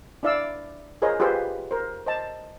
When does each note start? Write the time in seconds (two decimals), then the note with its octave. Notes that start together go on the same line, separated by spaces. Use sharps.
0.23 D4 E4 D5 F5 E6
1.02 F4 G#4 A#4 C5 C#5 D#5
1.20 F4 G4 G#4 B4 C5
1.71 A#4 C5
2.06 C5 D#5 A5